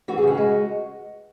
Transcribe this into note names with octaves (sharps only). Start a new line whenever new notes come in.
E3 F#4
G#4
C#3 F#4
G#3